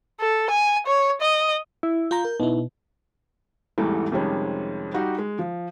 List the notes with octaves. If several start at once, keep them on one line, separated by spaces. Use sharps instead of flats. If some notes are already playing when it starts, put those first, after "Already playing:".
A4
G#5
C#5
D#5
E4
F4 A#5 G6
A#4
B2 D#4 E4
A1 E2 G#2 E3 G3 A3
F2 C3 D#3 G3 G#3 C#4
G3 D#4 F#4 G4
G#3
F3